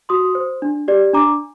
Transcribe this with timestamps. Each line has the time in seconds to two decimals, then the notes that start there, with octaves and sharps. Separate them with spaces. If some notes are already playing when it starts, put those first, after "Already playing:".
0.09 F#4 C6 D#6
0.35 C5
0.62 D4
0.88 G4 D5
1.13 D4 A#5 D6